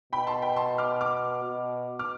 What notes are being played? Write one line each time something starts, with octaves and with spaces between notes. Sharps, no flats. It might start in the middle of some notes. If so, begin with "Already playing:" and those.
B2 G5 B5
A5 C6
G5 B5
A5 C6
D6 F6
D6 F6
B2
D6 F6